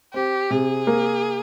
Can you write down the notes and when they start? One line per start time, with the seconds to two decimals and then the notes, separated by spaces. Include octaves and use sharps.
0.14 C4 G4
0.51 C3 G#4
0.87 A#3